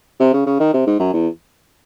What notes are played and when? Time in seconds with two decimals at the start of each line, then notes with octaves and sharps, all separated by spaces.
0.20 C3
0.33 C#3
0.46 C#3
0.60 D#3
0.74 C3
0.87 G#2
1.00 F#2
1.14 E2